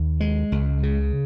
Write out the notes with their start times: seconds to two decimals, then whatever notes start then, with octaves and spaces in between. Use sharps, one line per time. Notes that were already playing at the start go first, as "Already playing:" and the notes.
Already playing: D#2
0.20 G#3
0.52 C#2
0.83 C#3